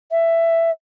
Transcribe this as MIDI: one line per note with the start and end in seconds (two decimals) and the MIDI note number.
0.11 0.70 76